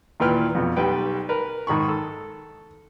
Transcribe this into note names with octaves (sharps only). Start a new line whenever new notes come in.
D#2 A#2 E3 B4 G5 F6
F2 B2
B1 G3 B4 G5
A#4 B4
G#2 D#3 B5 C#6
A4